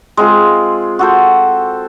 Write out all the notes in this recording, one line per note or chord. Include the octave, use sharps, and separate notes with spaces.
G#3 C4 F4
F#4 A4 C5